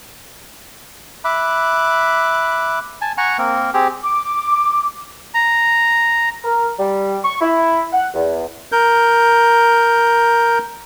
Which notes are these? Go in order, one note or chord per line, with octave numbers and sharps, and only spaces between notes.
E5 B5 D6 F#6
G#5 A5
F#5 G#5 A#5 C#6
A#3 C4 A#4
C4 G4 G#4
D6
A#5
A#4
G3
C#6
E4
F#5
E2
A#4 G6